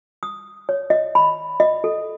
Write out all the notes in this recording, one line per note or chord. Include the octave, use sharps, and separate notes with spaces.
D#6
C#5
D#5
B5
D#5
A4